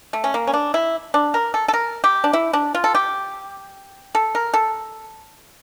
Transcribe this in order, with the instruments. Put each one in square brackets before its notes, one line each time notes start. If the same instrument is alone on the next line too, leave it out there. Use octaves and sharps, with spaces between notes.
[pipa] A3
C#4
A#3
C#4
D4
E4
D4
A#4
A4
A4
A#4
G4
D4
E4
D4
F4
A4
G4
A4
A#4
A4